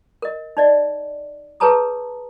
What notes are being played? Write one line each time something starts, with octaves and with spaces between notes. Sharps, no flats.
A#4 D#5
D#4 D5 D#5
G#4 B4 C#5 A5 A#5 D#6